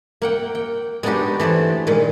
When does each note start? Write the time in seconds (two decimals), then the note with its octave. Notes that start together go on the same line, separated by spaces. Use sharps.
0.22 A#3 F#5 G5
0.55 G5
1.03 G#3 B3 D4 D#4 F#4 G4
1.40 E3 A3 C5 D5
1.87 A#2 D#3 G#3